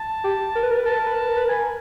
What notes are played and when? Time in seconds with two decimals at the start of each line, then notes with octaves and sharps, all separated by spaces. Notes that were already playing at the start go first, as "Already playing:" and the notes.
Already playing: A5
0.24 G4
0.55 A#4
0.63 B4
0.70 A#4
0.77 B4
0.85 A#4 A5
0.92 B4
0.99 A#4
1.07 B4
1.14 A#4
1.21 B4
1.29 A#4
1.37 B4
1.45 A#4
1.49 B4 G#5
1.60 A#4